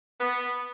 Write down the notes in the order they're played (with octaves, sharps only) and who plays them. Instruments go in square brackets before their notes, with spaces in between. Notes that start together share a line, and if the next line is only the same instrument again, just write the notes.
[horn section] B3